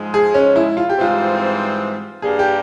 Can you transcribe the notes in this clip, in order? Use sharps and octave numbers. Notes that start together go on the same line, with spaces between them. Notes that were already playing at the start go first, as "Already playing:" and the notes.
Already playing: G#2 F3 G#3
G#4
C#4
E4
F4
G4
G#2 E3 G3 C4 F4
G2 G3 A#3 G#4
G4